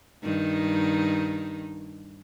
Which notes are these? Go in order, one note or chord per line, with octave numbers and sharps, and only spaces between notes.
G2 D#3 D#4